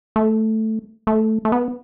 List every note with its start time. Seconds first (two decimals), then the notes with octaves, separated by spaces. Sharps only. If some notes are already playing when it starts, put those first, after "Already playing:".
0.16 A3
1.07 A3
1.45 A3
1.52 B3